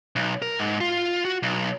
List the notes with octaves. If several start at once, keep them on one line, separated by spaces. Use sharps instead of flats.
B1
A#4
G#2
F4
F#4
B1